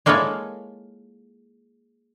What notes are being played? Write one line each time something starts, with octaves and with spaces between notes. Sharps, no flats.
G#3 A#3 E4 F4 A4 C#5